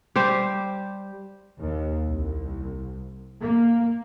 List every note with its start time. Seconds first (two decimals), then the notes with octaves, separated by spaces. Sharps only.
0.16 G3 G4 C5
1.59 D#2
2.09 C2
3.41 A#3